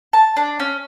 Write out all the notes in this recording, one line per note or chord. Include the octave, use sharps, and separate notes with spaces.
A5
D4
C#4